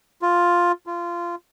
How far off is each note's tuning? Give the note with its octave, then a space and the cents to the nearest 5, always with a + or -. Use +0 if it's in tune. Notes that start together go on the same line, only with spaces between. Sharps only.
F4 +5
F4 -20